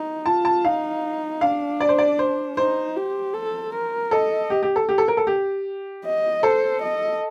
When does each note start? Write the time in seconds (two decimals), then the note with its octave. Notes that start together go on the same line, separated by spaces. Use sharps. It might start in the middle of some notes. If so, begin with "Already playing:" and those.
Already playing: D#4
0.26 F4 A5
0.45 A5
0.65 D#4 F5
1.41 D4 F5
1.80 D5
1.89 C5
1.98 D5
2.19 C5
2.57 D#4 C5
2.96 G4
3.34 A4
3.73 A#4
4.11 A4 D#5
4.50 G4
4.63 G4
4.76 A4
4.89 G4
4.98 A4
5.08 A#4
5.17 A4
5.27 G4
6.05 D#5
6.43 A4 C5
6.82 D#5